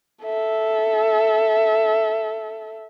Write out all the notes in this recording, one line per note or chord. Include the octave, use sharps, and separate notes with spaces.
A4 E5